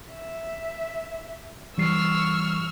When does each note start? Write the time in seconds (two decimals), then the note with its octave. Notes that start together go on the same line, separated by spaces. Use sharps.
0.13 E5
1.78 E3 G3 C#6 E6 F6 C7